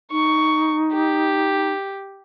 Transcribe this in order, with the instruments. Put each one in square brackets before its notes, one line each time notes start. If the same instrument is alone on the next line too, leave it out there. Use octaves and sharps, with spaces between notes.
[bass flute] D#4 [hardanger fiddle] C#6
[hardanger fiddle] G4